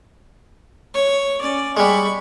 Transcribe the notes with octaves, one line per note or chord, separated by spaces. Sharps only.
C#5
C#4 D5
G3 G#3 B5 C#6